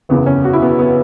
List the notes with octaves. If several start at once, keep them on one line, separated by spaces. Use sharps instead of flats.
F#1 E2 C#3 E3 B3
C#4
F#4
E4
B3
B3